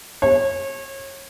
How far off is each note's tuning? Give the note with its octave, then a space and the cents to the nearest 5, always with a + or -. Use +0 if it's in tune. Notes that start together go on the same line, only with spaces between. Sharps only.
C#5 -30